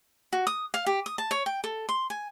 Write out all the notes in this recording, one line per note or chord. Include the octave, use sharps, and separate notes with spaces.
F#4
D#6
F5
G4
D#6
A5
C#5
G5
A4
C6
G#5